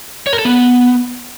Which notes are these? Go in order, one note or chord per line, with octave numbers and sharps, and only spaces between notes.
C#5
A#4
A4
B3